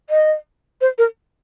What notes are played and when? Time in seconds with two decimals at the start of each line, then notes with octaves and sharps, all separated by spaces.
0.10 D#5
0.81 C5
0.98 A#4